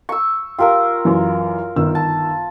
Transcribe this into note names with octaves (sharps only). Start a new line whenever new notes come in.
C#6 E6
F4 G4 A#4 E6
F#2 E3
G1 D#3 E6
A5